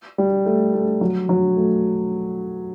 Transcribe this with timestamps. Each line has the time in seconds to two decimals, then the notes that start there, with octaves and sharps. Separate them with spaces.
0.18 G3
0.46 A3
0.74 A3
1.01 F#3
1.29 F#3
1.57 A3